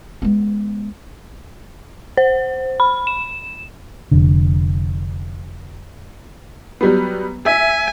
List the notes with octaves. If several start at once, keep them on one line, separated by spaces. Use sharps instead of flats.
G#3 B3
C5
B5
E7
F1 D3
F#3 G3 B3
E5 G#5